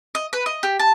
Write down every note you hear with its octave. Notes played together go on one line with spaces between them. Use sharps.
D#5
B4
D#5
G4
A5